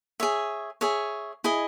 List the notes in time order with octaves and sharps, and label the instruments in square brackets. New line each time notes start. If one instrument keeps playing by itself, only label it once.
[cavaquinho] G#4 C#5 E5
G#4 C#5 E5
E4 G#4 D#5